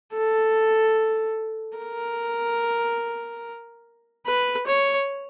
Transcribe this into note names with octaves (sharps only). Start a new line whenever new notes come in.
A4
A#4
B4
C#5